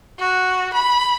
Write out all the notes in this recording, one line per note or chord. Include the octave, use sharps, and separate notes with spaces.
F#4
B5